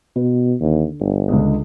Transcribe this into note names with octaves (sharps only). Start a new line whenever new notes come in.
B2 B4
D#2 D3
G1
C#2 D3 G#3